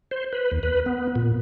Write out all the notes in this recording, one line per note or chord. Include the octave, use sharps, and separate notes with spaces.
C5
B4
D#2
B4
B3
A#2